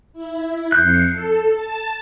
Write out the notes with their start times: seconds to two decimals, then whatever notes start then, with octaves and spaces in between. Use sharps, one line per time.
0.13 E4
0.72 F2 F#6 G6 C7 C#7
1.11 A4
1.53 A5